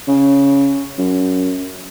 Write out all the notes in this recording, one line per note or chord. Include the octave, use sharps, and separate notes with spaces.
C#3
F#2